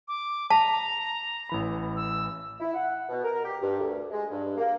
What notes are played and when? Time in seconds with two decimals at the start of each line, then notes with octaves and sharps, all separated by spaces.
0.08 D6
0.50 A5 A#5 B6
1.49 A1 E3 B5
1.96 E6
2.60 E4
2.74 F#5
3.09 B2
3.24 A#4
3.43 G4
3.62 G2
3.80 D2
4.11 G#3
4.31 G2
4.58 A#3